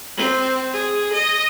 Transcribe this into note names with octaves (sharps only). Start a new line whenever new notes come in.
C4
G#4
D#5